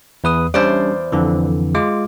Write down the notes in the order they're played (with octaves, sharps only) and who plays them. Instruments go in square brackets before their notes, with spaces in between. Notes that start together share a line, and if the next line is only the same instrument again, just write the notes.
[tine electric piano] E2 B4 D#6
[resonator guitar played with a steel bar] E2 C5 D5 [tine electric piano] G3 C#4 D4
[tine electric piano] F2 D3 E3
G#3 F4 D6